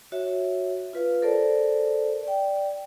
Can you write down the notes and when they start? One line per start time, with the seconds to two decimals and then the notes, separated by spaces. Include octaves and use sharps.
0.12 F#4 C#5 E5
0.93 F4 B4 F5
1.22 A4 A#4 C5 D5 A5
2.23 D5 G5